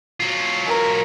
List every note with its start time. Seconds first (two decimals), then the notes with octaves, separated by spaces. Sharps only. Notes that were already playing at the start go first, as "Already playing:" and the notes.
0.20 F#3 F4
0.66 A#4